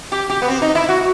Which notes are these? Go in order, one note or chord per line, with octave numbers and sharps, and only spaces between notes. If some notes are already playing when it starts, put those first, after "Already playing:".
G4
G4
B3
C4
D#4
E4
F#4